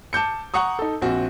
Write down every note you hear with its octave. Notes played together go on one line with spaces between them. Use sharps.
A5 D6 G6 C#7
F#5 A#5 C#6 D#6
D#4 A4
A#1 C4 F#4